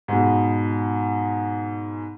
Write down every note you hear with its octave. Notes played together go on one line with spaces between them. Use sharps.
G#2 B2